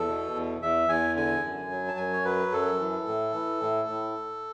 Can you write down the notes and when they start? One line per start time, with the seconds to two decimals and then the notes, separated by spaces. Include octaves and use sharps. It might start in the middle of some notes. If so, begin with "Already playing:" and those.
Already playing: E2 A4
0.08 B2
0.35 E2
0.62 E2 E5
0.89 E2 G#5
1.16 D3 G#5
1.44 F#2
1.70 F#3
1.88 A5
1.97 F#2 G#5
2.13 C#5
2.25 F#3 B4
2.52 F#2 A4
2.80 E3
3.06 A2
3.33 E3
3.61 A2
3.88 A2